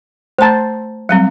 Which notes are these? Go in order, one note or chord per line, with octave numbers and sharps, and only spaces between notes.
A3 C5 A5 A#5
F#3 G3 C4